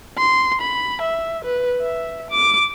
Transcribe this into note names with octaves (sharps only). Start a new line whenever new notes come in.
C6
B5
E5
B4
E5
D6